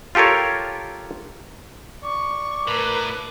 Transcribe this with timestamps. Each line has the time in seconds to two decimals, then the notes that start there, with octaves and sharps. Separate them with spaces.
0.15 F4 G4 A4 A#4 C#5
2.04 D5 C#6
2.67 A2 A#4 B4